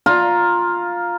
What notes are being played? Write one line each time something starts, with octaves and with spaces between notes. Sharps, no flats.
F4 A#5